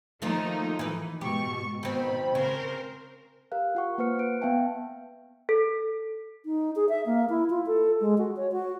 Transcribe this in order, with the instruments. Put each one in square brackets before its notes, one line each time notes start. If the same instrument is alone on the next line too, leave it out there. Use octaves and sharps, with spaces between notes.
[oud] D#3 A3 F4 [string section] F3 A#3 D#4
[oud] E3 B4
[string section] G#2 B2 C#6 [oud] G4
[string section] B2 B5 [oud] D#3 C4
[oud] C#3 [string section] A#4 C5
[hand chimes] G4 A#4 F5 F#6
F4 F#5 C#6
A#3 B4 C5 F#5 F6 C#7
B4 F#6 D7
B3 E5 F5 G5 A5
[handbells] A4
[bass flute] D#4
G#4
E5
A#3
E4
F4
A4
G#3
F#4
C#5
F#4